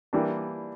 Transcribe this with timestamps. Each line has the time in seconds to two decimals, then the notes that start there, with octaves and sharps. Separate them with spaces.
0.13 E3 G3 A#3 D4